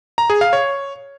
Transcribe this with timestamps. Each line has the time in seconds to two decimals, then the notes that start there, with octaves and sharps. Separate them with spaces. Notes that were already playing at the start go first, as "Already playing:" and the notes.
0.18 A#5
0.30 G#4
0.41 F5
0.53 C#5